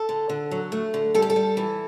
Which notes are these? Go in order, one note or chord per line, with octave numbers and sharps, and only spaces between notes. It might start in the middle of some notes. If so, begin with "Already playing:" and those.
Already playing: A4
D3
D3
F#3
A3
D3
G3 A4
G4
A4
G3
E3